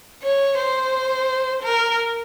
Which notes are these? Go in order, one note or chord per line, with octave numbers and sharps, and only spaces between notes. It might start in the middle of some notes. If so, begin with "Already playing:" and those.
C#5
C5
A#4